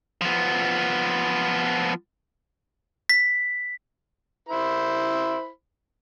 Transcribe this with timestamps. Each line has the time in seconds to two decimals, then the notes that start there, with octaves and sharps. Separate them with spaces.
0.21 F3 B3
3.09 B6
4.49 E4 C5 B5